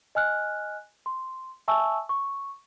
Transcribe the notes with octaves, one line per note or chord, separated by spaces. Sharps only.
D#5 G#5 F6 F#6
C6
E5 G#5 A5 C#6 E6
C#6